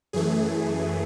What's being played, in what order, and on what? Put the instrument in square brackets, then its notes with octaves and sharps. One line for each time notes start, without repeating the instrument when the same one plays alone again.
[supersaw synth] F#2 E3 A3 G#4